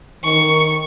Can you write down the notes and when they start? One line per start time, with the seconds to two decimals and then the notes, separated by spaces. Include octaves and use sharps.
0.24 D#3 C#6